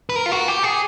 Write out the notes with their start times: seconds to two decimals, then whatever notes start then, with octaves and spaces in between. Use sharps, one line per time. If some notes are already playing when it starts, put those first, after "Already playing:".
0.09 B4
0.16 A#4
0.26 F4
0.32 F#4
0.48 G4
0.63 G#4